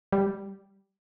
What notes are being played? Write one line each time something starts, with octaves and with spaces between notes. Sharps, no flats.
G3